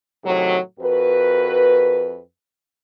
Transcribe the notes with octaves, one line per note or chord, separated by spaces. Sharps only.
A2 C3 D#3 F#3
F2 F#4 A#4 B4